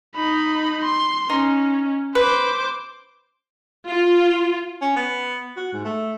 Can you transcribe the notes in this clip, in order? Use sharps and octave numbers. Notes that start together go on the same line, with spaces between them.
D#4 B5
C6
C#4 D#4
B4 C5 D6
F4
C#4
B3
F#4
G#2
A3